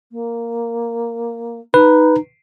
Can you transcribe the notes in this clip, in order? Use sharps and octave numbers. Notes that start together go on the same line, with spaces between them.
A#3
D#4 B4